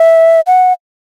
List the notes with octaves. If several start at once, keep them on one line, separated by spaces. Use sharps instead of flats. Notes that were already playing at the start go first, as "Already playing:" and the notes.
Already playing: E5
F#5